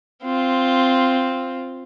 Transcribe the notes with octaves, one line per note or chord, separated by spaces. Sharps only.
C4 F4